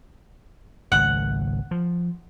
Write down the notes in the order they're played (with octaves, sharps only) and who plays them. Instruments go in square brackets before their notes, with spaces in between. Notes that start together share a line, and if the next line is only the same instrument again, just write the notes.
[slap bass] G#1 C#2 [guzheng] F#5
[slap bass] F3